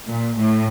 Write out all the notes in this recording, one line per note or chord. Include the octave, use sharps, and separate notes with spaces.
A#2
A2